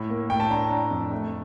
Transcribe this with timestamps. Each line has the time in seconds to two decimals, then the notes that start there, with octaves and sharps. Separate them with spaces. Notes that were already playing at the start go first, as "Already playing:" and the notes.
Already playing: A2
0.09 A#3
0.29 A2 G5
0.40 A5
0.50 D4 A#5
0.71 D4
0.91 F2
1.12 A3